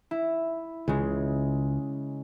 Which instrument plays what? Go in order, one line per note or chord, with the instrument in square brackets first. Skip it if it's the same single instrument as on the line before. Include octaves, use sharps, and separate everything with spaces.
[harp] E4
[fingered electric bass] C#2 [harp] C#3 G#3